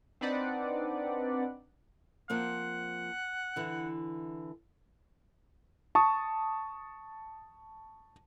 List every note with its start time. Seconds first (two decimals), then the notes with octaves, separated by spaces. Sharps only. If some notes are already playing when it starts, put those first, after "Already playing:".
0.21 C4 D4 D#4 B4 D5 F#5
2.30 F3 A#3 C4 F#5
3.56 D3 E3
5.95 A5 C#6 D#6